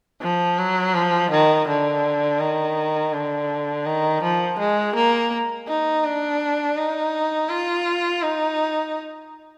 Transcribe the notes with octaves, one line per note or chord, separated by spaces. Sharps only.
F3
F#3
F3
D#3
D3
D#3
D3
D#3
F3
G#3
A#3
D#4
D4
D#4
F4
D#4